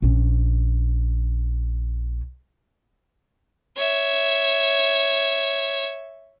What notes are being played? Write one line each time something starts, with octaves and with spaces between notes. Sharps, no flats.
A#1 C#4
C#5 E5